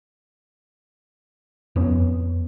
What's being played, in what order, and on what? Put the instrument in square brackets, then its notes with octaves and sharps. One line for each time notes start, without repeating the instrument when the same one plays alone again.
[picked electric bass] F2 B3 C#4